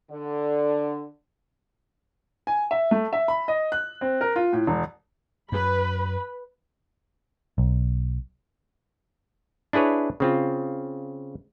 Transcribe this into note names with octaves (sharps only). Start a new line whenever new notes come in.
D3
G#5
E5
A3
E5
B5
D#5
F#6
C4
A#4
F4
A2
E1
F#2 B4 B5
B1
D4 E4 G#4 B4 C#5
C#3 C4 F4